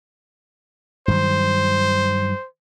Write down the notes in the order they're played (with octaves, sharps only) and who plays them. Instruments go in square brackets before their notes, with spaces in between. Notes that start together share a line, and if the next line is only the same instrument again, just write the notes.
[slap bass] G2 D#3 F#3 [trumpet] C5